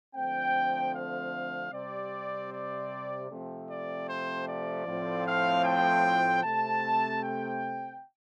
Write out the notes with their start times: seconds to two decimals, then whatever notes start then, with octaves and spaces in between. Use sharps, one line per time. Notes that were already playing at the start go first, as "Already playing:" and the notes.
0.15 D3 F3 A3 C4 G5
0.94 F5
1.72 C3 G3 C4 D5
2.51 D5
3.30 C3 F3 A3 C4
3.69 D5
4.08 C5
4.47 D5
4.87 A2 F3 C4
5.26 F5
5.65 G5
6.43 C3 A3 C4 A5
7.22 G5